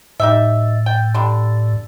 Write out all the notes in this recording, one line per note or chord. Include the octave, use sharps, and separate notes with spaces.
A2 D#4 G4 E5
G5
D3 G3